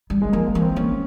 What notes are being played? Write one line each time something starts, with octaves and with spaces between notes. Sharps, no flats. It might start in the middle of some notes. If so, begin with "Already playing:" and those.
G3
G#3
F3 A#3
A#3
E3
C4
A#3 C#4